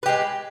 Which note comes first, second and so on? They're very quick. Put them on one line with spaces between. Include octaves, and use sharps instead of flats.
B4 G4 G#3